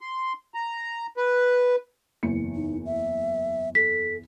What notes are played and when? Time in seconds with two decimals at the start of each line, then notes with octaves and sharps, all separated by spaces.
0.01 C6
0.54 A#5
1.17 B4
2.23 F#1 E2 C#7
2.55 D#4
2.86 E5
3.75 A4 B6